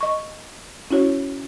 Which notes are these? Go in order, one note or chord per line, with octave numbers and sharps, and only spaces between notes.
D#5 C#6
C#4 E4 F#4 C#5